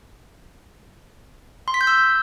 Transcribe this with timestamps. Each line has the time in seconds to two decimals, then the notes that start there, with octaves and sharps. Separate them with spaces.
1.68 C6
1.74 B6
1.81 G6
1.87 E6